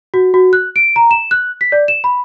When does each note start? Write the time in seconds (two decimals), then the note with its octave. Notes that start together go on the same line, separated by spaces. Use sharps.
0.14 F#4
0.34 F#4
0.53 F#6
0.76 D7
0.96 A#5
1.11 E7
1.31 F#6
1.61 B6
1.72 D5
1.88 E7
2.04 B5